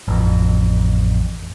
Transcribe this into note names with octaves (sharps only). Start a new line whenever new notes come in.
A1 F2